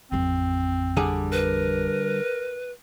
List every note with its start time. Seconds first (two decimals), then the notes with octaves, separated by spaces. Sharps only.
0.12 A1 F2 C4
0.97 D3 G3 G#4
1.32 A#4 B4